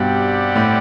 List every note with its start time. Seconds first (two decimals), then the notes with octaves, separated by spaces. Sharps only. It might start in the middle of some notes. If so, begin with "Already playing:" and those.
Already playing: G2 B2 G3 C4 G4 D5 F#5
0.56 A2